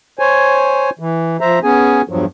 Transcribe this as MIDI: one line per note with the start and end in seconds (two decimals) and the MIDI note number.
0.19 0.90 72
0.19 0.90 73
0.19 0.90 80
0.99 1.37 52
1.41 1.59 53
1.41 1.59 72
1.41 1.59 76
1.41 1.59 82
1.63 2.02 59
1.63 2.02 61
1.63 2.02 68
1.63 2.02 80
2.09 2.25 40
2.09 2.25 43
2.09 2.25 53
2.09 2.25 54